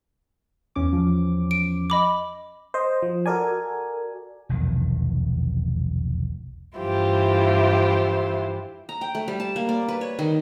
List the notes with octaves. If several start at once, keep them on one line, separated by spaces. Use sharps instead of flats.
E2 C#4 D6
F3
D7
D#5 B5 D6
C5 D#5
F3
F#4 A4 A#4 D5 G#5
F1 B1 E2 D#3
G2 E3 E4 F4 G4 C5
A#5
G5
A3
G3
A5
A#3
D5
B4
C#5
D#3